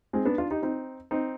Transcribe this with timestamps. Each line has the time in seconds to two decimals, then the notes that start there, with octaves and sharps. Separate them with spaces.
0.13 G#3 C4
0.25 B3 D4
0.38 D4 F4
0.51 D#4 G4
0.62 C4 D#4
1.11 C4 D#4